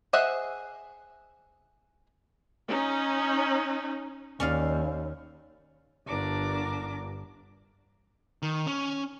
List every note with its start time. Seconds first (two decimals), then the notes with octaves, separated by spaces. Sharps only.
0.13 G#4 C5 D#5 E5 F#5
2.69 C#4 D#4
4.40 D#2 C#4 D5 F5
6.07 G1 G2 D4 A#4 D6
8.42 D#3
8.67 C#4